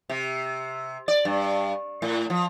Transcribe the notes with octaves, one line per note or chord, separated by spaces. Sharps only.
C3
D5
G2
A2
F3